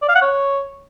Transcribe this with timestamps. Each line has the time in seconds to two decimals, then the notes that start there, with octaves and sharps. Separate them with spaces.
0.02 D5
0.09 F5
0.15 F#5
0.22 C#5